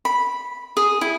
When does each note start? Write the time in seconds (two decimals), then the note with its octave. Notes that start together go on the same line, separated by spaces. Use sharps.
0.05 B5
0.77 G#4
1.01 E4